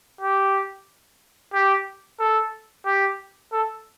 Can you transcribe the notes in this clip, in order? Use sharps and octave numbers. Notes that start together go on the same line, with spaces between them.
G4
G4
A4
G4
A4